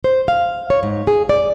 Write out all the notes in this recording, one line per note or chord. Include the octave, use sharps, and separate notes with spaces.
C5
F5
C#5
G#2
G#4
D5